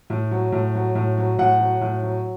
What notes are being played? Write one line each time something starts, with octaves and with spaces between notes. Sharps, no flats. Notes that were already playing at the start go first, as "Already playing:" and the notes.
A2
F#3
A2
F#3
A2
F#3
A2 F#5
F#3
A2
F#3